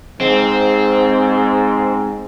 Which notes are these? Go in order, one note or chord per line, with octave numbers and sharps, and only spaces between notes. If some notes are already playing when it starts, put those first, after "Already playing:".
G#2 C4